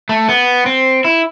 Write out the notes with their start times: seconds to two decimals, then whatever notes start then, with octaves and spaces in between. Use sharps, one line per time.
0.09 A3
0.29 B3
0.66 C4
1.05 E4